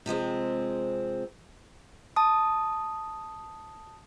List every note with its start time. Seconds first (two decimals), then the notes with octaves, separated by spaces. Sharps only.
0.06 C3 F3 G#3 C4
2.16 A5 D#6